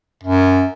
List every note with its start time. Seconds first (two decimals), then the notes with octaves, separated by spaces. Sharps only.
0.23 F#2